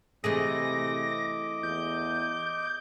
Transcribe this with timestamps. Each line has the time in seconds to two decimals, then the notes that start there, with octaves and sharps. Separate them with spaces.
0.24 C3 E3 A3 G#4 D#5 D6 A#6
1.63 E2 G6